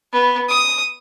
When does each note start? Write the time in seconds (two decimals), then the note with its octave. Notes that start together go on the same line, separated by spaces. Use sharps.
0.13 B3
0.49 D#6